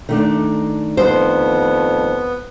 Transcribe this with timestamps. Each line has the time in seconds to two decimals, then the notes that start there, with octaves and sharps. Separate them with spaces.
0.09 D#3 A3 D4
0.97 F2 B3 C5